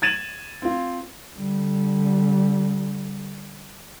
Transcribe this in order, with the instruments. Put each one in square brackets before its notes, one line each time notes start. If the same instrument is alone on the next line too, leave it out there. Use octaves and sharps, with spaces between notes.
[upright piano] G#6 A6 D#7 E7 F#7
C4 F4
[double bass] D3 G3